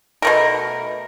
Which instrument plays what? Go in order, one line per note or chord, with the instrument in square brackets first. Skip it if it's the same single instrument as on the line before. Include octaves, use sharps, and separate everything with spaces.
[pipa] B2 A3 A#4